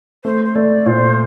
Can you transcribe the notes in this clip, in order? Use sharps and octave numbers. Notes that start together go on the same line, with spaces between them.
A3 C5
C5
A3 D5
A#2 C5